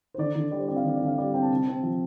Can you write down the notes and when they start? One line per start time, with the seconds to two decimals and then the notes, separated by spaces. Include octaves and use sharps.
0.14 C5
0.18 D3 D5
0.36 D3
0.51 G3 D5
0.60 C5
0.68 C4 D5
0.76 F5
0.84 D3 D5
0.96 D5
1.01 D3 F5
1.18 G3 D5
1.34 C4 G5
1.42 A5
1.51 C3
1.68 C4
1.83 F3